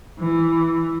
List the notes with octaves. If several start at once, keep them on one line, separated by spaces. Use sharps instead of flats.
E3